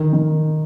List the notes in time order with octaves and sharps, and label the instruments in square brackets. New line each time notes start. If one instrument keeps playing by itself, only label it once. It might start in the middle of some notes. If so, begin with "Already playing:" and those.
Already playing: [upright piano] D#3
D#3